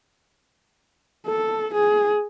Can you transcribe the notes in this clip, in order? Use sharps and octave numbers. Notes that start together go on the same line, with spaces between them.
A4
G#4